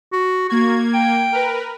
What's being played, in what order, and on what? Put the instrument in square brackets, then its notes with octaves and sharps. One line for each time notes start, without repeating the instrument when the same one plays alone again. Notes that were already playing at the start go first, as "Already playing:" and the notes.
[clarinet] F#4
[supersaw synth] A#3 G#6 [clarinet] F#4
[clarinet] G5
[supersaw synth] A#4 B4